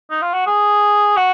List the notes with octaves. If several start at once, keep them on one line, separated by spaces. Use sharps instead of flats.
D#4
F4
F#4
G#4
F#4